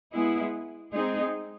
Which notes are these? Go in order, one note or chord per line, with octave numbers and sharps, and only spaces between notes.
G#3 B3 E4 G#4
G#3 C4 D#4 G#4